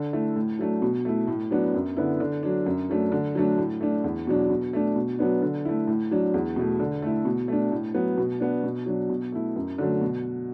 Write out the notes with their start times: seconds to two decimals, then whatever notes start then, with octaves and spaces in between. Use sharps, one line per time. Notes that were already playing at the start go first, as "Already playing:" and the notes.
Already playing: D3
0.13 A3 E4
0.36 A2
0.59 F#3 A3 D4
0.82 B2
1.05 A3 E4
1.27 A2
1.51 F#3 B3 D4
1.74 F#2
1.97 D3 B3 E4
2.20 D3
2.43 F#3 D4
2.66 F#2
2.89 F#3 A3 D4
3.12 D3
3.35 F#3 A3 D4
3.58 A2
3.81 A3 D4
4.04 E2
4.27 B2 F#3 D4
4.49 B2
4.73 A3 D4
4.96 B2
5.19 F#3 B3 D4
5.42 D3
5.65 A3 E4
5.87 A2
6.11 F#3 D4
6.34 E2
6.56 B2 A3
6.80 D3
7.02 A3 E4
7.25 B2
7.48 A3 D4
7.72 A2
7.94 F#3 B3
8.18 B2
8.40 B3 D4
8.64 B2
8.86 F#3 D4
9.10 B2
9.32 A3 E4
9.56 F#2
9.78 D3 F#3 A3
10.02 B2